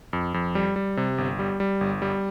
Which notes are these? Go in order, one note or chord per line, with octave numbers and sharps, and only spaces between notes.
F2
F2
G3
G3
C3
G1
G3
G3
G1
G3